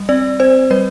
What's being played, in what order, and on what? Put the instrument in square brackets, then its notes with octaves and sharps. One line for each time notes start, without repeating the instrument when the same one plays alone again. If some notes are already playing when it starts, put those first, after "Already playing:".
Already playing: [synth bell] G3
C4 D5
C4 C5
G3 B4